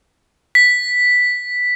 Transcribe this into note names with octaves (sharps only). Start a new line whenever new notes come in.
B6